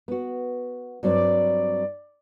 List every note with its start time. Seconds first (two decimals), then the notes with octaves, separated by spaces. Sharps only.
0.08 B3 F#4
1.03 G2 F#3 C4 D5